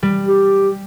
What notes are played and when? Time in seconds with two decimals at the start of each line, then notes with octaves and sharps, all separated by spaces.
0.03 G3
0.27 G4